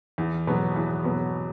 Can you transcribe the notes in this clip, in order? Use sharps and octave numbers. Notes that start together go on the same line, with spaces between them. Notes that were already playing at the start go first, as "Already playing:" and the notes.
E2
B2 F#3 B3
E2
B2 F#3 B3